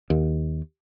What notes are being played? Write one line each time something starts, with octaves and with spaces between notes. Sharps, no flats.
D#2